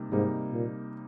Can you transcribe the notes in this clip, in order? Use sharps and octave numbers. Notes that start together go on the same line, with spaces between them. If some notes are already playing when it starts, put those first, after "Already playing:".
Already playing: C3 G3 A#3 D#4
G#2 C3 G3 A#3 D#4
A#2